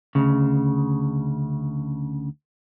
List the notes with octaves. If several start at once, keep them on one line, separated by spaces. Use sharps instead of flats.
D2 C#3